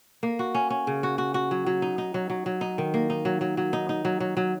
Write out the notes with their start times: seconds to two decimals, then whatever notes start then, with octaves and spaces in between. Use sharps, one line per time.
0.23 A#3
0.39 F#4
0.55 C#4
0.70 C#4
0.87 C#3
1.03 F#4
1.18 F#4
1.34 F#4
1.51 F#3
1.66 F#3
1.82 D#4
1.98 D#4
2.14 F#3
2.30 F#3
2.46 F#3
2.61 D#4
2.78 D#3
2.94 A#3
3.10 D#4
3.25 F#3
3.41 F#3
3.57 F#3
3.73 D#4
3.89 D#4
4.05 F#3
4.20 F#3
4.37 F#3